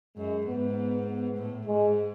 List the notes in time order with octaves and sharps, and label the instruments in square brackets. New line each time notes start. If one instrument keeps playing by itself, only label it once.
[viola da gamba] F#2 [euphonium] G#3
[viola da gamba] G#2 [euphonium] B3
[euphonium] B3
B3
[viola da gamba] A2
[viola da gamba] G#2 [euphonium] G#3